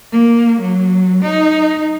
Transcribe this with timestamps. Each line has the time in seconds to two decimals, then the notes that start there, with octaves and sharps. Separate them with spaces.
0.12 A#3
0.61 F#3
1.23 D#4